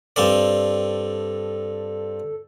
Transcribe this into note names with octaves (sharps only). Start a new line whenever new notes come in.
G2 C4 A4 D5